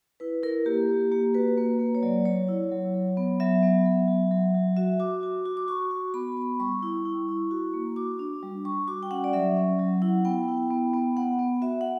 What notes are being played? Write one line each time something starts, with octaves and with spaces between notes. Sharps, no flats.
E4 B4
E4 A#4
A#3 G4
A#3
A#3 G4
F#4 B4
A#3 B4
A#3
C#5
F#3 D5
F#3 C#5
E4
F#3
F#3
B3
F#3 E5
B3
F#3
F#3
F#3
F#3
F#4 E5
F#4 D6
F#4
F#4
D6
F#4 C#6
F#4
B3 B5
B3
G3 C#6
E4
E4
E4
F#4
A#3
F#4 D6
D4
G3
G3 C#6
F#4 D6
G5
C#4 F#5
D5
F#3 E5
C#4
F#3
E4 F#5
B3 G5
E4
B3
B3
B3 F#5
B3
F#4 E5
F#5